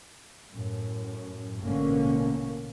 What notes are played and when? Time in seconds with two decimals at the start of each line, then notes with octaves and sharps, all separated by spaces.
0.51 F#2 A2
1.59 A1 G#2 B2 D3 A#3 C#4